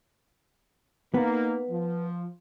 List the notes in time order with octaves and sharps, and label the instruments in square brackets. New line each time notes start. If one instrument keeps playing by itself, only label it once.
[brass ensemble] A#3 D#4 [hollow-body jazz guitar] B3
[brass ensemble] F3